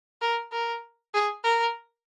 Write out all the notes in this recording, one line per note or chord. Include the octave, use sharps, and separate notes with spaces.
A#4
A#4
G#4
A#4